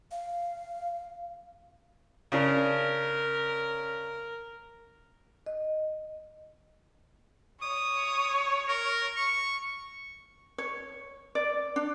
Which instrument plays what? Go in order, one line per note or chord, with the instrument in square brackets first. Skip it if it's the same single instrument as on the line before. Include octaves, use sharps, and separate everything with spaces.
[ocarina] F5
[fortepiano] C#3 D4 [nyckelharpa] A#4
[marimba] D#5
[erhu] C#5 [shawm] D#6
[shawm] A#4
C#6
[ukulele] C#5
D5
D4